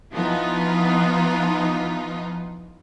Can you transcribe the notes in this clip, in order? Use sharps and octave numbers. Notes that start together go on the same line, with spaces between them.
E3 F3 B3 D#4 F4